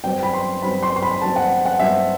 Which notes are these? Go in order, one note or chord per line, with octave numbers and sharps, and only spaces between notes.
G2 F#3 C4 G5
B5
C6
G2 F#3 C4 B5
C6
C6
B5
G2 F#3 C4 A5
F#5
F#5
G2 F#3 C4 E5